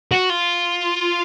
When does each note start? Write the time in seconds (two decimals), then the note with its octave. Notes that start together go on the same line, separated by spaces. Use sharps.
0.12 F#4
0.30 F4